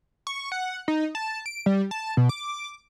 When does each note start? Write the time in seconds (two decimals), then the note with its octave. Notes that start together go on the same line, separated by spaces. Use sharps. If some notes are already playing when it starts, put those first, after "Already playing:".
0.27 C#6
0.52 F#5
0.88 D#4
1.15 A5
1.46 D7
1.66 G3
1.91 A5
2.17 B2
2.29 D6